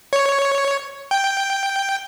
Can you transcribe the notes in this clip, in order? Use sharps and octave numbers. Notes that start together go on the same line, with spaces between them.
C#5
G5